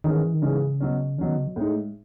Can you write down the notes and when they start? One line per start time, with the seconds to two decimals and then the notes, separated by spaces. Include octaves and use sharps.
0.04 G#2 D#3 E3 G#3 C#4
0.24 E3
0.34 D#3
0.42 G#2 C#3 E3 G#3 C#4
0.80 B2 F#3 C#4
1.18 B2 E3 F#3 C#4
1.27 D#3
1.37 C#3
1.47 F#3
1.56 A2 G#3 A3 D#4
1.76 G#3